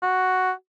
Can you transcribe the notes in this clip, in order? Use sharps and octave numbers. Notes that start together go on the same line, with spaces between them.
F#4